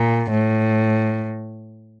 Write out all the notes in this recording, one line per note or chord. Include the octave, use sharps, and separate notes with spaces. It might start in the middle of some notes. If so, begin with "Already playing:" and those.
Already playing: A#2
A2